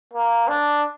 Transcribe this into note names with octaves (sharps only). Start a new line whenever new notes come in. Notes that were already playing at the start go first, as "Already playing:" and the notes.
A#3
D4